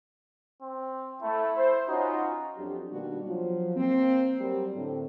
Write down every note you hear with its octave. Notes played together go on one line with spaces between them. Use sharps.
C4
A3 E4
C5
C#4 D#4 F4 F#4
F2 F#3 D4 F#4 G4
B2 D#3 G3 A#3 D4 F#4
F3 F#3
A#3 C4
F#3 G3 C4 G4 A#4
A2 D3 C4